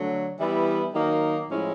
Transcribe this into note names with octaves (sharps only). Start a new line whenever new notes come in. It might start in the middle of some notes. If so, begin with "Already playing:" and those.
Already playing: D3 F#3 A3
E3 G3 B3 E4
D#3 F#3 A#3 D#4
A2 F3 G#3 C#4 E4